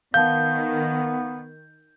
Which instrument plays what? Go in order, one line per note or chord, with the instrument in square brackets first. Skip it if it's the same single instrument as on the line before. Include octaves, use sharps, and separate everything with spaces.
[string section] D#3 [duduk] B3 [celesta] F5 A5 [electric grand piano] G6